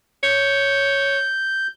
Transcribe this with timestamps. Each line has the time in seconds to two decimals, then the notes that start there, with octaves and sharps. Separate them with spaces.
0.24 C#5 G6